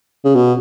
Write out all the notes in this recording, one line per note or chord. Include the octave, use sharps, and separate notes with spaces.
C#3
B2